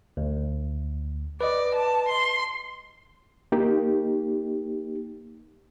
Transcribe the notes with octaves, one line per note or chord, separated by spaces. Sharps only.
D2
B4 D5 D#5
A5
C6
A#3 D#4 G4